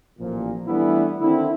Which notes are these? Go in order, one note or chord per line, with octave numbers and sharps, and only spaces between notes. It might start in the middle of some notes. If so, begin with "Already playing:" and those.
A1 A#2 F3
E3 G3 A3 B3 D4 E4
D3 D#3 C4 E4